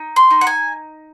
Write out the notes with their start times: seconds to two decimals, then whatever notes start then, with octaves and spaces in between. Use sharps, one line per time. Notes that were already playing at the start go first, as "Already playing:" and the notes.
Already playing: D#4
0.16 C6
0.31 D#4
0.41 F#5
0.47 G#5